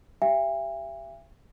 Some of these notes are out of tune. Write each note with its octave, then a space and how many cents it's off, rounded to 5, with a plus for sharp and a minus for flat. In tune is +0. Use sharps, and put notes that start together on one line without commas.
G4 +0 E5 +35 G#5 -45